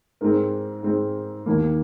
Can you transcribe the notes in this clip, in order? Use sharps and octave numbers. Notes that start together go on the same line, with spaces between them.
G#2 G#3 C4 A#4
G#2 G#3 C4
D#2 D#3 A#3